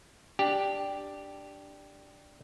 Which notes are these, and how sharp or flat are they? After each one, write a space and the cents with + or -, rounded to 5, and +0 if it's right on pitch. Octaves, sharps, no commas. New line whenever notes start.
D4 +0 G4 +0